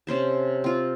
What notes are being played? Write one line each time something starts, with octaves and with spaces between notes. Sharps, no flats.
C3 C#4 C5 A5
C4 F4